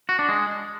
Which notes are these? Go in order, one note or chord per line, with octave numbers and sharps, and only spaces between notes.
F#4
D4
G#3